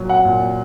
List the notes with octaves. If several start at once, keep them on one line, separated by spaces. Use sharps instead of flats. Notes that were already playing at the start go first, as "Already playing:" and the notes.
Already playing: A#2 F#3
F#5
A#2